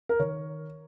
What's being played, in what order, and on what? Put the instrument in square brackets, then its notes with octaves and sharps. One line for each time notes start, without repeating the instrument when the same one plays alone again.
[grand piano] A#4
D#3 C#5